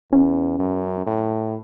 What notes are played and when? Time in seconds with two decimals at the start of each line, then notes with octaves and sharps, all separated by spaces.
0.12 E2 C#4
0.59 F#2
1.07 A2